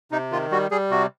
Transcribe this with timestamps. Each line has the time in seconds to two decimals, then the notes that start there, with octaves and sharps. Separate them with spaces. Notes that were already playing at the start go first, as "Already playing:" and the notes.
0.12 C3 D#4
0.32 D#3 F4
0.51 G3 F#4
0.71 G3 G#4
0.91 C3 F#4